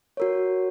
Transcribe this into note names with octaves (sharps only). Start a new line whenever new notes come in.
F#4 A#4 C#5